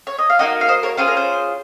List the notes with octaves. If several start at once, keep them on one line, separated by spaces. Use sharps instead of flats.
C#5
D#5
F5
A#3 D#4 F#4 D#5 F#5
F5
C5 D#5
A#4 C#5
C#4 F4 G#4 C5
A#4
C5